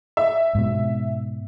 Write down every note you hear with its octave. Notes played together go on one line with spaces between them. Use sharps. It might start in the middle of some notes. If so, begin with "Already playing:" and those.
E5
G#2 B2